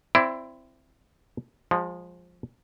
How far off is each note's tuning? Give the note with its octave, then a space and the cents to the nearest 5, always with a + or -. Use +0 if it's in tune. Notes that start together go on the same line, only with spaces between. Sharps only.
C4 -5 E4 +15 D5 -10
F3 +15 G#3 -20